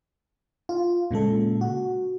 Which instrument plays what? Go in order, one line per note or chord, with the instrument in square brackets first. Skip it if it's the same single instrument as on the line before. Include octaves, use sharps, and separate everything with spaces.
[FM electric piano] F4
A#2 C#3 G#3 A4
F#4